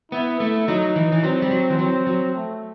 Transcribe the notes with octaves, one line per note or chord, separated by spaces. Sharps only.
B3 E4
A3
F#3 D#4
E3
E3
F#3 C4
G3
F#3
E3
F#3 C4
F#3
A3